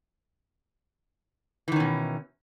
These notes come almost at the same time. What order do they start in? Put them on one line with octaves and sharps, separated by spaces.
E3 D#3 C#4 B2